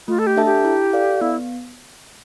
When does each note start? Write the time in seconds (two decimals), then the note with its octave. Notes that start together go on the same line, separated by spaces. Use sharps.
0.08 A3 F4
0.19 A4
0.27 G4
0.37 D4 A4 E5 A5
0.46 G4
0.65 E4
0.93 A4 D5 F5
1.21 B3 E4